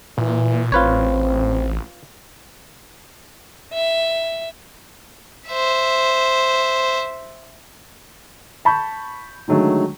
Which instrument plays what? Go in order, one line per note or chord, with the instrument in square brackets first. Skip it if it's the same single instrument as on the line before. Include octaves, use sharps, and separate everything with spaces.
[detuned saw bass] A#2 [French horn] E3
[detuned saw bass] A1 [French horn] C4 [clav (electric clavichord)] F4 B4 C#5
[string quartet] E5
[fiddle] C5 E5
[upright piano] A5 B5 C#6 G6
D3 D#3 F#3 G#3 A3